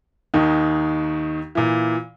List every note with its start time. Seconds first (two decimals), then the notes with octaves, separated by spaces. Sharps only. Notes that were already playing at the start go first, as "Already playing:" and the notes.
0.34 D#2 D#3 D#4
1.55 A#2 E3